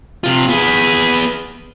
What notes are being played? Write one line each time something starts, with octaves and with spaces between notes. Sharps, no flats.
C3 F4
B3 G#4